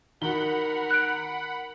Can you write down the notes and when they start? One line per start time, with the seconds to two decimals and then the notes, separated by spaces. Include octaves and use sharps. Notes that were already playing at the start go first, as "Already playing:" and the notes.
0.22 D#3 F#4 A#4 F#5 B5 G7
0.91 F#6 D7